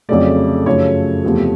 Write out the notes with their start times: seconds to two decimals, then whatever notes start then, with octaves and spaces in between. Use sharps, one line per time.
0.09 F2 C#3 F#3 A3 D5
0.66 F#2 C#3 F3 A3 C#5
1.24 E2 C3 F3 A3